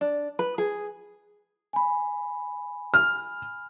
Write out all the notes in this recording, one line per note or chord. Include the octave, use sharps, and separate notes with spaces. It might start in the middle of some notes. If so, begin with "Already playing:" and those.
D4
B4
G#4
G#5 B5
F6